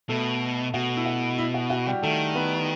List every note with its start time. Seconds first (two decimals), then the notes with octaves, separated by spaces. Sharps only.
0.09 B2 A3 A4
0.74 B2 F#4
0.97 E4
1.06 F#4
1.38 E4
1.54 F#4
1.70 F#4
1.86 G3 G4
2.03 D#3 A3 A4
2.35 B3 B4